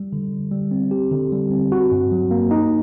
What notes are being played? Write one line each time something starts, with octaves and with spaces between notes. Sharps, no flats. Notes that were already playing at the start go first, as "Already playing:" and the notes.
Already playing: G3
D3
D3
G3
C4
G4
D3
G3
C4
F#4
G2
F#3
A#3
D#4